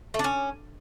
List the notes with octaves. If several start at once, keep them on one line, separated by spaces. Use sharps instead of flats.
A3
D4
C#4